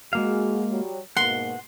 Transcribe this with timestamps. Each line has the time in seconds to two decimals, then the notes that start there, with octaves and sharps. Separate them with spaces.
0.13 G#3 A#3 F#4 G#4 F5
0.70 F#3 G3
1.17 G#2 B2 A#3 F#5 C6